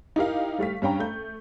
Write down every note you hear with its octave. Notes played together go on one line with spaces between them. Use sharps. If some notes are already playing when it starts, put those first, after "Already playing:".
D#4 E4 G4 A#4 F5
G3 A3 F5 B6
G2 C#4 F5 G5 A#5
A3 G6